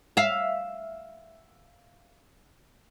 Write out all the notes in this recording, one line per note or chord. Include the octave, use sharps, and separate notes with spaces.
E5 F5